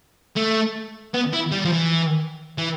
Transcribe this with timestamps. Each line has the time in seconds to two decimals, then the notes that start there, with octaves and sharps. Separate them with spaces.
0.36 A3
1.14 B3
1.33 E4
1.52 G3
1.65 F3
1.72 E3
2.58 E3